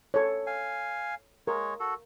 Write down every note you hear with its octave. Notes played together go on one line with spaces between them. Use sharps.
A4 C#5
F5 G#5
G#3 A#4 C#5
F#4 A4